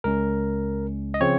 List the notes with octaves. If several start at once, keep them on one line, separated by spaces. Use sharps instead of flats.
C#2 C#3 G#3 C#4 A#4
D#5
C#3 F3 C4 C#5